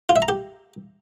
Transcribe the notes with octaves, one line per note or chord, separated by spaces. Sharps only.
F4
E5
A#5
G4